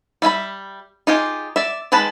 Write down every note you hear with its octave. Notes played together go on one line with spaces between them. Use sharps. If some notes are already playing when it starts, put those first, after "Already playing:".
G3 E5 G#5 B5
D#4 F4 G4 G#4
D5 E5
D#3 G#3 B4 A5 B5